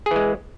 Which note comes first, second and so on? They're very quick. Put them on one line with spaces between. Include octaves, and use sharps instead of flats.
G#4 E3 G#3